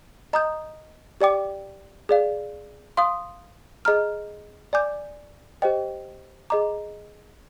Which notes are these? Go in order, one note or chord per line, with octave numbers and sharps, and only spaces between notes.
D#5 A#5 D#6 G6
G4 D5 G5 D6
G#4 D5 F5
F5 C6 D#6
G#4 D#5 A#5 F6
D5 G#5 D6 G6
G4 C5 D#5 G5
G#4 D#5 A#5 D6